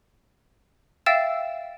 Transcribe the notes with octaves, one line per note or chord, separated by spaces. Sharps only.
E5 F5 G5 E6 A6 E7